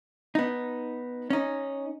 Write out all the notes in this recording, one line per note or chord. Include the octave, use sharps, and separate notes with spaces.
B3 D#4
C#4 D#4